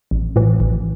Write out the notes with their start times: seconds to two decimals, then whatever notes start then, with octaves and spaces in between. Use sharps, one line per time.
0.11 A1
0.36 A2 E3
0.60 A1